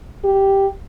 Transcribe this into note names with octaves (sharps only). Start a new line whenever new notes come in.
G4